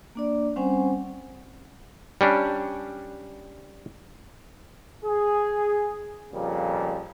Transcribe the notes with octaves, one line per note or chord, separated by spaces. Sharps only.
A#3 D4 D5
G3 C4 C#4 C5 F#5 G#5
G3 C#4 D4
G#4
F2 A#2 C#3 F3 G3